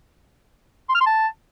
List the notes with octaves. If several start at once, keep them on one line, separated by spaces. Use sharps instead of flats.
C6
F6
C6
A5